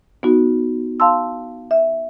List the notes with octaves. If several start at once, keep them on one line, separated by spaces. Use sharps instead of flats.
B3 D#4 F#4
F5 A5 C6 E6
E5